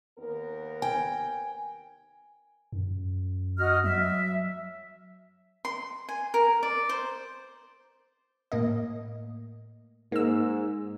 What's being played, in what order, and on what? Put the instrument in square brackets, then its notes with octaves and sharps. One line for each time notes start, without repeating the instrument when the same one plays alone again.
[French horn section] D#2 B3 A#4
[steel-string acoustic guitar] G5 [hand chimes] G#5
[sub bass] F#2
[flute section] F#4 D#5 F6
[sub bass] F#3 [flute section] E5
[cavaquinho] C6
G#5
A#4
D5
C5
[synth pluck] A2 A#3 D#5
[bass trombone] G#2 [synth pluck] A#3 E6